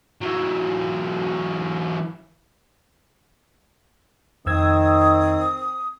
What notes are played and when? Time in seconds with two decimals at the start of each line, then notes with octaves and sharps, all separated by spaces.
0.21 E3 F#3
4.46 F2 D#3 C4 D#6 E6 G#6